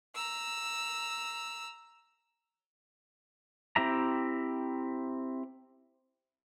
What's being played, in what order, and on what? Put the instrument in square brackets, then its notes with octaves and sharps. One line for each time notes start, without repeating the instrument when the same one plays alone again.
[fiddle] A#5 E6
[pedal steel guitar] C4 E4 G4 E5 A#5